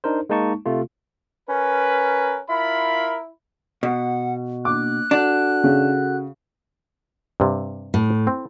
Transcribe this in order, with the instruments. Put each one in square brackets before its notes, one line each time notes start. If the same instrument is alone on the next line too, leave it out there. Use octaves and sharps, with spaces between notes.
[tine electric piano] D4 D#4 A#4 C5
G#3 A#3 D#4 A5 C#6
C3 A3 F4
[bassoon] C#4 [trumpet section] A#4 B4
[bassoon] E4 [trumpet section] F4 A#4 B5
[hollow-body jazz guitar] B2 [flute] F#5
[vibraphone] A#3 D4 [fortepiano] D6 [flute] F#6
[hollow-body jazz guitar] D4 [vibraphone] F#4 A4 F#5
[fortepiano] C#3
[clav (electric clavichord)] G2 C3
[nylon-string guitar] A2
[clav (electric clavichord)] C4